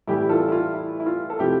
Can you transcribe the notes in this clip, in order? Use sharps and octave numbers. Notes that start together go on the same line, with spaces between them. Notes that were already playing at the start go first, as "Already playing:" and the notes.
A2 E3 G3 E4 G4
F4 A4
E4
F4
E4
E4
F4
A4
C3 F3 A3 E4 G4